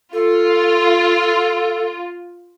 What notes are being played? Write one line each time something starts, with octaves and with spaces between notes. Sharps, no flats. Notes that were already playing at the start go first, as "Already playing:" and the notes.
F4 A4